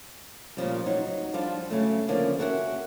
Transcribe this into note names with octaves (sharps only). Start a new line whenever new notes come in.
A#2 C#3 F3 G3
F#3 D#4
F3 G3 D4 F4
C#3 F#3 A3
D3 F3 A#3 C#4 D4
F#4 G#4 A#4 E5 F#5